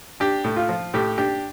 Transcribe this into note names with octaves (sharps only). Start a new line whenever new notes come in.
D4 G4
A2
F4
F3
A2 G4
D4 G4